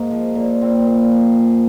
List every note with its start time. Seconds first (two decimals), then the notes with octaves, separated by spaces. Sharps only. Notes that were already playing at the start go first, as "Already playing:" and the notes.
Already playing: G#2 A#3
0.11 F3
0.35 A#2
0.62 A#2 C4
0.86 A#2
1.12 F3
1.36 F3